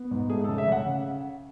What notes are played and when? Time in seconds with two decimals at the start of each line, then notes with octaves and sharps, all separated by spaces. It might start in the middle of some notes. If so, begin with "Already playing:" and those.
Already playing: B3
0.11 G#2
0.30 A3 G#4
0.44 C#3 A4
0.58 E5
0.68 C#3 F#5